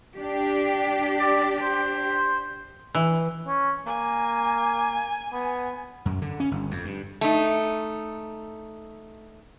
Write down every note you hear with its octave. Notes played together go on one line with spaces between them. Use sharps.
D4 G4
D5
C5
E3
C#4
A#3 G#5
B3
F#2
D3
C#4
G1
F2
G2
A3 D#4